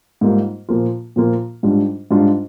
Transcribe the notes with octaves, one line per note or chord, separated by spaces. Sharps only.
G#2 G3 A#3 F4
A#2 F3 A#3 F4
A#2 F3 A#3 F4
G#2 G3 D4 F4
G#2 G3 D4 F4